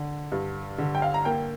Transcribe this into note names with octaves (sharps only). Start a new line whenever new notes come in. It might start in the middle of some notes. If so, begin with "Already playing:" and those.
Already playing: D3
G2
D3
G5
F5
A#5
A#3 G5